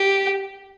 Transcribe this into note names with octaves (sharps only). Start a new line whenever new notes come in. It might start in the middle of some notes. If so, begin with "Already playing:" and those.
Already playing: G4